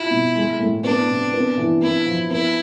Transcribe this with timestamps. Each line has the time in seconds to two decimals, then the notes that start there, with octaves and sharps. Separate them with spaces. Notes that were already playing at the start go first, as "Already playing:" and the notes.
Already playing: E4 F4
0.11 B2
0.35 G#3
0.59 A2
0.84 B3 D4
1.08 C3
1.33 B3
1.57 E3
1.82 B3 E4
2.06 F3
2.30 B3 E4